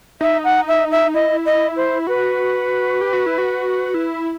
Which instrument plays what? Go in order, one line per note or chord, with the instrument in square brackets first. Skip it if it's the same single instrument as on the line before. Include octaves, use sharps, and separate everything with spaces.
[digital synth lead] D#4 [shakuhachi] E5
[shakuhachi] F#5
E5
E5
[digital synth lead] E4 [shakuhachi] D#5
[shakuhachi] D#5
C5
[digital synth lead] F#4 [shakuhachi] B4
[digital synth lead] G4
F#4
E4
F#4
E4